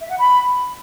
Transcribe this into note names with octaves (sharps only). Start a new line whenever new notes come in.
E5
F#5
B5